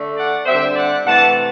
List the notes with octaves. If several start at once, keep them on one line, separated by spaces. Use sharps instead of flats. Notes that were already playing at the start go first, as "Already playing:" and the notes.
Already playing: D3 A3 D4
D5 F#5
D3 G3 C4 C5 E5
D5 F#5
C3 E3 A3 F#5 A5